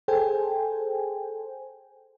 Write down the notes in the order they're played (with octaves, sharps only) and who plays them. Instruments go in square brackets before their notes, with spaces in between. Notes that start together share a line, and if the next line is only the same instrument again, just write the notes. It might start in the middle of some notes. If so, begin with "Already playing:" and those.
[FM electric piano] G#4 A4 C5 G5 G#5